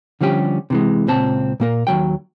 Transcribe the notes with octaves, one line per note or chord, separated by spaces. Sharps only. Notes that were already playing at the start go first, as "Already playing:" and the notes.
D3 F3 G3 C#4 G4
C3 E3 G#3
C#2 A#2 C4 A5
A#2 A#3 A#4
D#2 D#3 F#3 G5